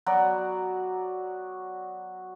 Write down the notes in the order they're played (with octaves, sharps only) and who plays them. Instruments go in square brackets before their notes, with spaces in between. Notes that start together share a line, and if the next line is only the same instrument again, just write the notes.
[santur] F#3 B3 F#4 D5